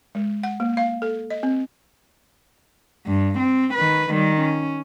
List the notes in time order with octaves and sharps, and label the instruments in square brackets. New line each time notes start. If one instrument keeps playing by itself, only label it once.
[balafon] G#3
F#5
A#3
F5
A4
D#5
C4
[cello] G2
C4
D#3 B4
D#3 G3
C#4